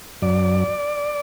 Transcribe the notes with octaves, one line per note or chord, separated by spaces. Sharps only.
F#2 D5